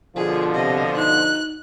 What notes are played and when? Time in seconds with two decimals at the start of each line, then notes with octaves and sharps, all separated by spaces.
0.16 B2 D3 F3 F4 G#4
0.55 C3 D#5
0.97 D#4 F#6